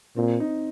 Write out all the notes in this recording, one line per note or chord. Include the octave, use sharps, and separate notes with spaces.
A#2 C4
D#4